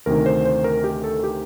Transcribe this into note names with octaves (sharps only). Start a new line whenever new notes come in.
D2 C3 D#3 A#4
C5
C5
A#4
G4
A4
G4